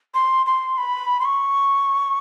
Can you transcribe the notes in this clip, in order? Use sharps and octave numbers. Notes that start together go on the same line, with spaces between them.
C6
C6
B5
C6
C#6